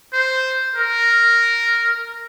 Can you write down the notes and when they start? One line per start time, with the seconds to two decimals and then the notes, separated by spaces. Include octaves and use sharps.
0.13 C5
0.75 A#4